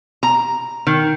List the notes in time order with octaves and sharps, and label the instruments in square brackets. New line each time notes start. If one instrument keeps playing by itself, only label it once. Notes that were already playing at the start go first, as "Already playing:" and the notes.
[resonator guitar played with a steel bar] A#5
D#3